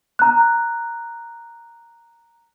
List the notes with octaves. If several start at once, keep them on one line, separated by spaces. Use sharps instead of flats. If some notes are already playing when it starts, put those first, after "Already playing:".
A#5 F#6